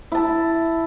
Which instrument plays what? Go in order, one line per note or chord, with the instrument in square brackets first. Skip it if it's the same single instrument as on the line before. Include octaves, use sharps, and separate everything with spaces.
[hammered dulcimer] E4 A5